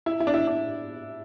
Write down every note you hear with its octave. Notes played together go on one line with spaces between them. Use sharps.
E4
E4
D4
E4
D4